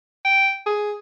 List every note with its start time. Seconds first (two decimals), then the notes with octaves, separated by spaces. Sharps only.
0.25 G5
0.66 G#4